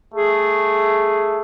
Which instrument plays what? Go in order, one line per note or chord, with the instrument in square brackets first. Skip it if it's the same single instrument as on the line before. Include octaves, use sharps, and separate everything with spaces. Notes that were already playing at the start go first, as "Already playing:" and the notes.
[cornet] A3 [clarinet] G#4